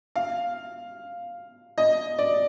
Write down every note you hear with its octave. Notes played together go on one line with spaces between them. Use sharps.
F5
D#5
D5